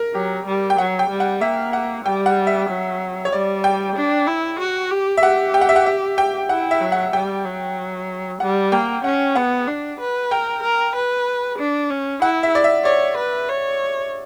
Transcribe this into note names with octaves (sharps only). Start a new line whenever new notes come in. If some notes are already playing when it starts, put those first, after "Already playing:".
Already playing: A#4
F#3 G4
G3
G5
F#3 F#5
G5
G3
F#5
A#3 E5
F#5
G3 G5
F#5
E5
F#3
C#5
G3 D5
G5
D4
E4
F#4
G4
E5
G4 F#5
G5
F#5
E5
F#5
E5
G5
E4 F#5
E5
F#3
F#5
G3 G5
F#3
G3 F#5
A#3 G5
C#4 F#5
B3 F#5
D4
B4
A#4 G5
A#4
B4
D4
C#4
E4 F#5
E5
D5
E5
C#5 D5
B4
C#5